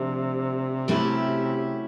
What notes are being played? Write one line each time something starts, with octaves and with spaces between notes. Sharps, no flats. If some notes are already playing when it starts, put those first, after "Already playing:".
Already playing: C3 F3 A3 D4
F#3 A3 C#4 E4 G4